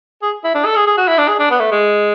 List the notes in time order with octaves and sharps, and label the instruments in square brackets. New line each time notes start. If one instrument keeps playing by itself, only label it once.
[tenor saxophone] G#4
E4
D4
A4
G#4
G#4
F#4
E4
D4
G#4
D4
B3
A3
G#3